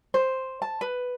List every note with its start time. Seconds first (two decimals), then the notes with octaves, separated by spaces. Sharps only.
0.14 C5
0.62 A5
0.81 B4